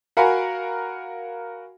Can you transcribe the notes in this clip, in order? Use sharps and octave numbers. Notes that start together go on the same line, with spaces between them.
F#4 A#4 F5 F#5 G#5 B5